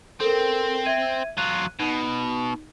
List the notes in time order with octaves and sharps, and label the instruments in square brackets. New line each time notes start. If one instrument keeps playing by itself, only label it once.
[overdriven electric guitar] C4 [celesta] A4 A#4
[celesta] E5 G#6 D#7
[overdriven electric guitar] F#3 F4 [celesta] F#6 D#7
[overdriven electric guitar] B2 [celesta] D#4